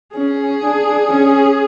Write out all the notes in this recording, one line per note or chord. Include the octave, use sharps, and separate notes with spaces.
C#4 G#4
D4
C#4